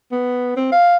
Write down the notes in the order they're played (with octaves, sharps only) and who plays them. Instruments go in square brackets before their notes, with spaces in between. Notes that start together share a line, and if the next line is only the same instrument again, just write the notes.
[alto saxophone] B3
C4
F5